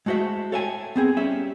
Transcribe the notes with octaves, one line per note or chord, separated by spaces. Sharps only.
G#3 A3 F#4 C5 E5
A4 C#5 E5 G5 G#5
B3 C4 G#4
G3 C#4 E5